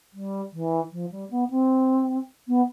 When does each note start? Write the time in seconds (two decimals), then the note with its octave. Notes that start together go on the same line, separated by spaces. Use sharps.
0.14 G3
0.53 E3
0.92 F3
1.11 G3
1.31 B3
1.50 C4
2.48 B3